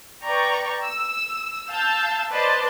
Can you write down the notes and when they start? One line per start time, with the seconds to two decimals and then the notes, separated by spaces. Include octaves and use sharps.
0.23 B4 D5 G5 A#5 C#6
0.82 E6
1.69 F5 A5 E6 G6
2.31 B4 C5 D5 D#5 A5 C6